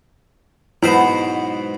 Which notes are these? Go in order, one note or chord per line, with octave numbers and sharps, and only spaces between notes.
G#2 B2 F#3 B3 E4 C5